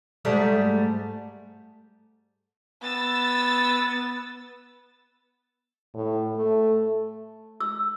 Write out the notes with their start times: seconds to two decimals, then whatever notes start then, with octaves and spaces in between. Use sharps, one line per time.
0.25 G#2 G3 A3
2.83 B3 E6 A6
5.94 A2
6.36 A3
7.60 E6